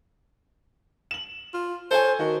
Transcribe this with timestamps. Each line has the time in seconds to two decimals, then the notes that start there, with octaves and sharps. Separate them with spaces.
1.11 E7 F#7
1.54 F4
1.91 A4 C5 C#5 G#5
2.19 D#3 F#4